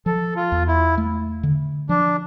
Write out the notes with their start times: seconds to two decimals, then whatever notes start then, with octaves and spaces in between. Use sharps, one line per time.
0.06 F3 A4
0.36 F4
0.52 E2
0.68 E4
0.98 A3
1.43 D3
1.89 F3 D4